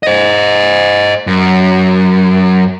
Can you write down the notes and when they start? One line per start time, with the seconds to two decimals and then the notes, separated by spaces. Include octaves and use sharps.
0.03 C5 D#5
1.27 F#2